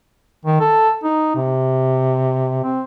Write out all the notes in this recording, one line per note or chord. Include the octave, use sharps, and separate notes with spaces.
D#3
A4
D#4
C3
C4